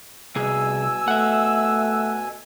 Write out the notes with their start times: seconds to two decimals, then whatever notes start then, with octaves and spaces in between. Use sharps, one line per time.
0.36 C2 B2 G#4 G#5 E6
1.08 A3 E5 F#5